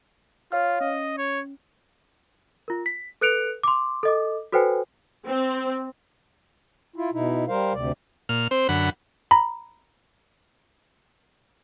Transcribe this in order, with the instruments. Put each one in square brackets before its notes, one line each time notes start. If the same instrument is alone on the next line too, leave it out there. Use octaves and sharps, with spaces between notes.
[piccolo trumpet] F4 [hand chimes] C#5 F5 F6
[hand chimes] C#4 [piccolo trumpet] D#5
[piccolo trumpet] C#5
[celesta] F4 A#4
B6
A4 B4 F#6 C#7 D7 F7
C6 D6
A4 D#5 D6
F#4 A4 B4 C5 G5 G#5
[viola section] C4
[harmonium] E4 F4
B2 D#4 E4
G3 A#4 C5 F5
D2 C3 D5
[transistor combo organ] A#2 F6
C4 C5
F#2 D3 F#5 B5
[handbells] A#5 B5